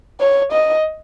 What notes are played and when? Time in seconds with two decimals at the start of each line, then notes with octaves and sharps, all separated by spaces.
0.20 C#5
0.52 D#5